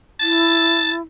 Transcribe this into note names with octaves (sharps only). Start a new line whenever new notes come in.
E4 A5